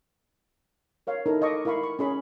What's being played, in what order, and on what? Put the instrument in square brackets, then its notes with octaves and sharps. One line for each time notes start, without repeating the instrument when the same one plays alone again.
[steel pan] A#4 C#5 F5
D#4 E4 A4 A#4
A4 D#5 F5 C#6 D6
E4 A#4 F5 B5 C#6
C#6
C#4 G#4 B5